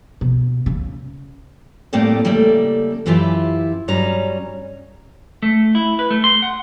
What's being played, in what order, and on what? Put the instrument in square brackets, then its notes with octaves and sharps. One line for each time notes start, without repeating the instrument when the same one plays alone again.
[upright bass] B2
C#3
[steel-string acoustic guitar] A2 G3 A3 A#3 C4 D5
C#3 G3 A3 A#3 A4
F#2 E3 E4 F4 G4 E5
G2 F#3 G3 C#4 A#5
[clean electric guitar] A3
E4
B4
A3
C6
F#5